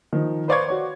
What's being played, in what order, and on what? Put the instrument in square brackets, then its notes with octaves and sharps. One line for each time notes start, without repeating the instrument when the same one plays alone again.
[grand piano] D#3 F3
B4 C5 D5 F5 C#6 G#6
F#4 C#5